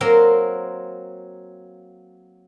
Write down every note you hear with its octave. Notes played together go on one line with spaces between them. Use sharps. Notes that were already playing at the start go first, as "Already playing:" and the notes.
F#3 A#3 C4 A#4 C6